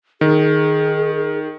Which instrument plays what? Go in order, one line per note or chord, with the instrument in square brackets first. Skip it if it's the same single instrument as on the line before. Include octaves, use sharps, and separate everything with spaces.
[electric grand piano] D#3 [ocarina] G#4